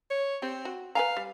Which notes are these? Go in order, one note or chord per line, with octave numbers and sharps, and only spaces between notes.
C#5
C4 G4
F#4
B4 F5 G#5 A#5
G3